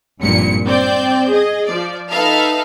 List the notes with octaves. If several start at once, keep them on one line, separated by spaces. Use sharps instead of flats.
G#1 G2 A#2 F3 C#7
C4 D5 G6
G#4 D#5
F3 D5
D#4 A4 B4 E5 F5 A5